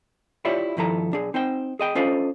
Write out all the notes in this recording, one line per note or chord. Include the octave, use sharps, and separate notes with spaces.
E4 F4 G4 C#5 D5 E5
G2 D#3 F3 E4 A4 A#5
B1 D4 G#4
C4 D#4 C5 G5
G#4 D#5 G5
C#4 D4 F4 A4 C5 D#5